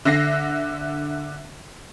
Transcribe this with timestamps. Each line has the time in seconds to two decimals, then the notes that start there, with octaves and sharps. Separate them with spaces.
0.05 D3 E5 A#6 C7